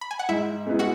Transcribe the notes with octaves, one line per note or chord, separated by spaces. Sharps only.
B5
G#5
F#5
G#2 E4 E5
G#3 B3 E4
F#4 F#5